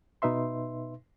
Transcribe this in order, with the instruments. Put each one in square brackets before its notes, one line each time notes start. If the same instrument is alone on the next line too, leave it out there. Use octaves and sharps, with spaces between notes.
[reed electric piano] B2 D#4 B4 E5 C6